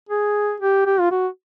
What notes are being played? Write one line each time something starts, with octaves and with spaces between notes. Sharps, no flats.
G#4
G4
G4
F4
F#4